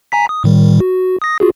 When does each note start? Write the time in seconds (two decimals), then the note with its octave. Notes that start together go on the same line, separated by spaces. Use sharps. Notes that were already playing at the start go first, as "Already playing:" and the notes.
0.12 G#5 A#5 B6
0.29 D#6
0.44 A2 D#3 G3
0.80 F#4
1.22 D#6 A#6
1.40 F4 F#4 G#4